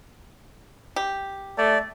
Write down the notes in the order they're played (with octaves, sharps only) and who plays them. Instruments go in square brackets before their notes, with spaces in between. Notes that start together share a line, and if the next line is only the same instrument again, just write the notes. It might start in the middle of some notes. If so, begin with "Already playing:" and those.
[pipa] G4
[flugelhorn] A3 [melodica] D5